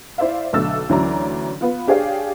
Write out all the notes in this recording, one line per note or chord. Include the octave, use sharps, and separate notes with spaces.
E4 C5 D5 E5 F5
B1 D3 A3 E6 A6
D2 E3 F#3 C#4 D5 A#5
B3 F4
D4 G4 G#4 C#5 D5 F5